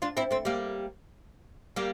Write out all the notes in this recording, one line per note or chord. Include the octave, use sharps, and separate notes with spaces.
D4 F4
C4 E4
A3 C4
G3 A#3
G3 A#3